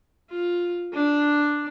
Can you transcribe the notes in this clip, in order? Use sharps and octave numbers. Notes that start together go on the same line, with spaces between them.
F4
D4